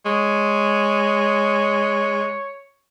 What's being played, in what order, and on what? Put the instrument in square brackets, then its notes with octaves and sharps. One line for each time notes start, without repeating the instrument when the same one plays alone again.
[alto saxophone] G#3 [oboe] C#5